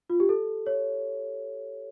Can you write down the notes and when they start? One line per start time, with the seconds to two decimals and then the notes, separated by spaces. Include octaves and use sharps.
0.10 F4
0.20 G4
0.29 A4
0.66 C#5